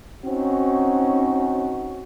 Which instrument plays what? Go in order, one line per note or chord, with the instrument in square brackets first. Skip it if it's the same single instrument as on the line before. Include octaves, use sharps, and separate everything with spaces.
[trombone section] C4 C#4 D#4 F#4